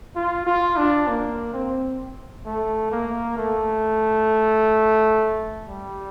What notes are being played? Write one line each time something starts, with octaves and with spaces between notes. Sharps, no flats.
F4
F4
D4
A#3
C4
A3
A#3
A3
G3